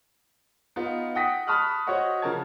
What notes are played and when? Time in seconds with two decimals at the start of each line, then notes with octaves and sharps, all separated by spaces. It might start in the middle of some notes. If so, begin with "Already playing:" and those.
0.76 B3 D#4 F4
1.15 F#5 G5 D#6 A#6 B6
1.47 A5 B5 C#6 D#6 F6 F#6
1.87 F#4 C5 C#5 D#5 F#5
2.22 C#3 F3 A#4 A5 G#6